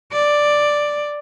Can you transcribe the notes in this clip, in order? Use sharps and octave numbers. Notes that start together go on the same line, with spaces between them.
D5